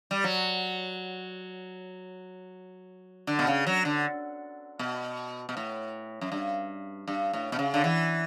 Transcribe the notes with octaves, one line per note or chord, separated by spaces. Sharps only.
G3
F#3
D3
B2
C#3
F#3
D3
B2
B2
A2
F#2
G2
G2
A2
B2
C#3
D3
E3